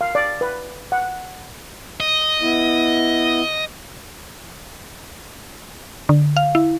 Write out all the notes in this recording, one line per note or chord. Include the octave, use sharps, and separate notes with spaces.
F5
D5
B4
F#5
D#5
B3 E4
D3
F5
E4